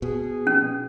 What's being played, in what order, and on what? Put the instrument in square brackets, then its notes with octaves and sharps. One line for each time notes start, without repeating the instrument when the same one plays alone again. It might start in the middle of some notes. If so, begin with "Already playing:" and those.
[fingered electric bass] B2 [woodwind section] G#4
[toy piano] C#4